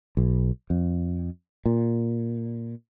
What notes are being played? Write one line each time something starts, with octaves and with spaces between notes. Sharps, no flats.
B1
F2
A#2